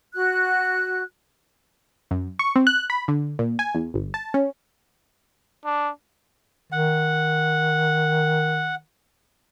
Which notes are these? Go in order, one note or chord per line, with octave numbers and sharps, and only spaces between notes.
F#4 F#6
F#2
C#6
C4
F#6
B5
D3
A#2
G#5
E2
G1
A5
C#4
D4
D#3 F#5